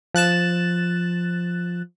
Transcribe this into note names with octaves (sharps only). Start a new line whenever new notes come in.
F3 F#6 A6 E7